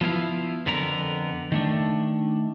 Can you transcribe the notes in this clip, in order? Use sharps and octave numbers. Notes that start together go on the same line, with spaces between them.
F3 B3 E4 F5
F2 D3 B3 A#4 A#5
D#3 A3 D4